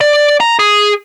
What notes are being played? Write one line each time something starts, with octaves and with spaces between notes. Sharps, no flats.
D5
A#5
G#4